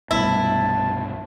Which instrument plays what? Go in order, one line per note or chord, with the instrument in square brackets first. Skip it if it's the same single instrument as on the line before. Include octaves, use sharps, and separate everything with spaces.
[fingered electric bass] C2 G2 B2 [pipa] E4 [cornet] A5